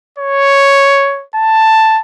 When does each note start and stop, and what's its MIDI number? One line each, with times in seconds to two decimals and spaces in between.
0.19 1.24 73
1.36 2.01 81